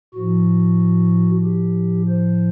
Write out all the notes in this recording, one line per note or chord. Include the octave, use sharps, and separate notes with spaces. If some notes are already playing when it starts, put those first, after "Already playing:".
A2 F3 F#4
G4
C5